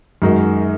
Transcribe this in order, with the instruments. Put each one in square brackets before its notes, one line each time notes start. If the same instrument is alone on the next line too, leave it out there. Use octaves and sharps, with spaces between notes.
[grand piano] F#2 D#3 G#3 D#4 F#4